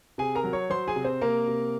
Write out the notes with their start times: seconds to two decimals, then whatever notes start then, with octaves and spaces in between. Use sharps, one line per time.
0.18 C3 G#4 G#5
0.35 A#4 A#5
0.44 F#3
0.53 C#5 C#6
0.70 F#3 C5 C6
0.88 G#4 G#5
0.96 C3
1.04 C4 C5
1.21 C3 A#3 A#4
1.47 C3